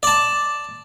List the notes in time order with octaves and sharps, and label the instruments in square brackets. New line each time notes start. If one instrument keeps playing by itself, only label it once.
[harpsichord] D5 A5